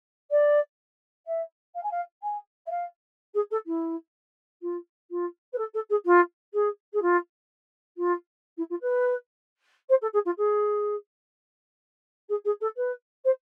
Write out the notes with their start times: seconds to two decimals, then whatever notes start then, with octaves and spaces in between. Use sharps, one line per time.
0.30 D5
1.26 E5
1.75 F5
1.83 G#5
1.91 F5
2.22 G#5
2.66 E5
2.70 F5
3.34 G#4
3.51 A4
3.66 E4
4.62 F4
5.11 F4
5.53 B4
5.58 A4
5.74 A4
5.90 G#4
6.05 F4
6.53 G#4
6.93 G#4
7.02 F4
7.97 F4
8.57 E4
8.70 F4
8.81 B4
9.89 C5
10.01 A4
10.13 G#4
10.25 F4
10.37 G#4
12.29 G#4
12.44 G#4
12.61 A4
12.76 B4
13.24 C5